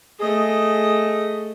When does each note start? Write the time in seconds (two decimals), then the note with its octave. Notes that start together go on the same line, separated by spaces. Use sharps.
0.20 A3 G#4 D#5